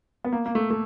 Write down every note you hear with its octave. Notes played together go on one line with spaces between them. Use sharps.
B3
A#3
A#3
A3
A3